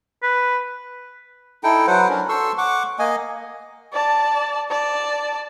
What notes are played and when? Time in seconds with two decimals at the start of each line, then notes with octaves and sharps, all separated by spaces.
0.23 B4
1.64 D#4 E4 A4 G5
1.87 F#3 B4 C5 F#5
2.09 F#3 C#4 D4 A#4
2.29 A4 C6 C#6 E6
2.58 F#5 C#6 D6
2.99 A#3 D#5 G#5
3.93 D5 A5
4.70 D5 A5